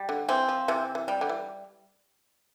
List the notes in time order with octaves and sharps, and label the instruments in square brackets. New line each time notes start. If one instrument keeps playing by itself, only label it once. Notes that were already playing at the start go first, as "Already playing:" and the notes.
Already playing: [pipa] G3
[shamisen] D3
[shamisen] E3 [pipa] C4
[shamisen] F3
[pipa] C3 [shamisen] E3
[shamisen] E3
[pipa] G3
[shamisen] D3
E3